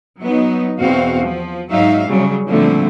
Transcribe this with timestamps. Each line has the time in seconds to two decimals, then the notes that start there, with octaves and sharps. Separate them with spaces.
0.20 F#3 B3 D#4
0.79 E2 B2 C4 F#4 F5
1.22 F3
1.71 G#2 F#3 D#4 E5 F5
2.08 C#3 F#3 G3
2.49 A#2 D3 F3 G3 A3 C4